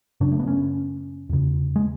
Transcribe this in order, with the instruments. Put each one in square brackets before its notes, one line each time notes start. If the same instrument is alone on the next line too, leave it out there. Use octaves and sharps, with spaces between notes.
[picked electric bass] F#2 C#3 D4
A3
B3
C#4
E2 C#3
G#3